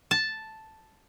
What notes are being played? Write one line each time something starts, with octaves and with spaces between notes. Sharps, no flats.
A5